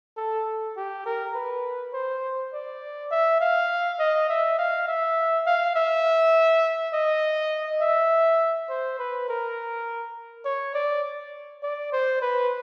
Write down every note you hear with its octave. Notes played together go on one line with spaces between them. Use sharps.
A4
G4
A#4
B4
C5
D5
E5
F5
D#5
E5
F5
E5
F5
E5
D#5
E5
C5
B4
A#4
C#5
D5
D5
C5
B4